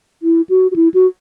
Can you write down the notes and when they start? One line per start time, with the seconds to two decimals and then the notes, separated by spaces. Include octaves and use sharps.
0.23 E4
0.49 F#4
0.71 F#4
0.76 E4
0.94 F#4